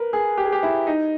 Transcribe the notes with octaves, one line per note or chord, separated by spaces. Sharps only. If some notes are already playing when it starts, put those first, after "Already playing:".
Already playing: A#4 B4
G#4
G4
G#4
G4
E4
D#4